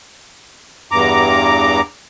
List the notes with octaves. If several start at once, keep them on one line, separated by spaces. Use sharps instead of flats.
E2 G2 A#5 D6